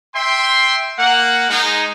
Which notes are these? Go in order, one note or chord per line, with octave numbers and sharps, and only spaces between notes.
E5 G5 C6
A#3 F#5
G#3 D#4